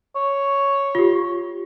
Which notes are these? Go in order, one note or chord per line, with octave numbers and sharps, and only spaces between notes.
C#5
F4 G4